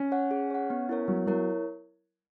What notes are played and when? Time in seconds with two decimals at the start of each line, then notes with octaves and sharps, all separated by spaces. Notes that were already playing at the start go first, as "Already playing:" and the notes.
Already playing: C#4
0.12 C#5 F#5
0.31 G#4
0.50 C#5 F#5
0.70 B3
0.89 E4 A#4 C#5
1.08 F#3 B3
1.27 F#3 E4 A#4 C#5